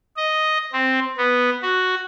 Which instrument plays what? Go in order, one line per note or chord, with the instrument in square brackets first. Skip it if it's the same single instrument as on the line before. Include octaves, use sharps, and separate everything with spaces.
[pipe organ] D#5
C4
B3
F#4